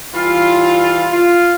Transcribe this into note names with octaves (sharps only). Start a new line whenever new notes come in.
E3 G3 F4
F4